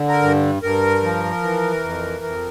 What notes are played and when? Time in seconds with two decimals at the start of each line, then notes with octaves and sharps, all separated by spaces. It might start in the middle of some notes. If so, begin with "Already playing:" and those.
Already playing: D3
0.08 A#4
0.22 G2
0.63 G2 A#4
1.03 F3
1.43 E3
1.84 F2
2.25 F2